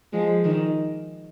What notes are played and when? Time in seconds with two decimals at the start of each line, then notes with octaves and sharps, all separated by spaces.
0.13 F3 G#3
0.44 D#3